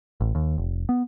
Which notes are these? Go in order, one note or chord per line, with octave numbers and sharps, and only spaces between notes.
A1
D#2
F1
B3